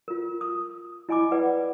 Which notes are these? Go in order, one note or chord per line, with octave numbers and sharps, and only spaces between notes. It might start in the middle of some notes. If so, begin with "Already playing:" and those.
F4 A#4
D#6
E4 D#5 G#5 B5 D6
B4 D5 F#5 G5